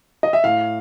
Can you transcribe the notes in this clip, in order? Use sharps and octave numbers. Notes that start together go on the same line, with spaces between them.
D#5
E5
A2 F5